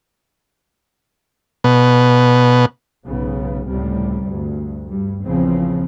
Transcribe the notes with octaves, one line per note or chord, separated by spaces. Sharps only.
B2
B1 G#2 C#3 B3
C#2 A2 C3 G3
D2 G2
G2 G3
A#1 E2 C#3 F3 C4